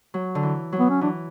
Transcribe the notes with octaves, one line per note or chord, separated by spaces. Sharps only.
F#3
D3
E3
F#3
B3
C#4
E3 D4